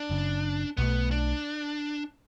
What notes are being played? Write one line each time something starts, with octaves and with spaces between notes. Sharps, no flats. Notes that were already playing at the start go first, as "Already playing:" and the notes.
Already playing: D4
F#1 F#2 C#3
B1 B2 A3 B3
D4